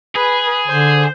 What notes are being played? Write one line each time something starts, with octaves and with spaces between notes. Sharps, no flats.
G#4 B4
D3 C5